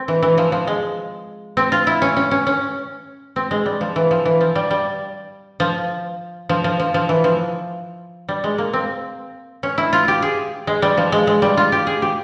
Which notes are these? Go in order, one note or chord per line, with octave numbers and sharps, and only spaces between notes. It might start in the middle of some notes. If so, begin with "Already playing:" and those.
Already playing: C4
E3
E3
F3
F3
G#3
C4
F4
E4
C#4
C#4
C#4
C#4
C4
G#3
G3
F3
E3
F3
E3
F3
G3
G3
F3
F3
F3
F3
F3
E3
F3
G3
G#3
A#3
C4
C#4
E4
F4
G4
G#4
G#3
G3
F3
G#3
G#3
G3
F4
G4
G#4
G4